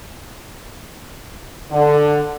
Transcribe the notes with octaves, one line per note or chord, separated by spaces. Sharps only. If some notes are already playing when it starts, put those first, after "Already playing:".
D3